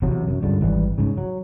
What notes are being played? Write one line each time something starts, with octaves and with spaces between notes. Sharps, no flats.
E2 C3 F#3
F#2
C#2 G2 D3
G#1 E3 G3
G#2 C#3
F#3